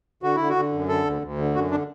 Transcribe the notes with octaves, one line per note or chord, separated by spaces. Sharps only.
D3 F#4
D3 E4
F#4
D3
F#2
D3 A4
D2
D2
D3
F#2 F#4
D3 D4